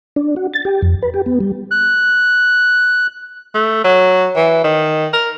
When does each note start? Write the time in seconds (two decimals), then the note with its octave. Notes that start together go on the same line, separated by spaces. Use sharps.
0.16 D4
0.36 F#4
0.54 A6
0.65 G4
0.82 F2
1.02 B4
1.14 G4
1.26 B3
1.40 G3
1.71 F#6
3.55 A3
3.84 F#3
4.36 E3
4.64 D#3
5.13 A#4